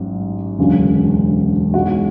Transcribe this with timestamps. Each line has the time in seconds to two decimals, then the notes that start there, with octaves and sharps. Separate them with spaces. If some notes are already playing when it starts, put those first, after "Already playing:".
Already playing: A1 G#2 F#3
0.58 E1 D2 C#3 F#3
1.73 B1 B2 G#3 F#4